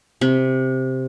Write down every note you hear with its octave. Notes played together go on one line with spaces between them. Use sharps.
C3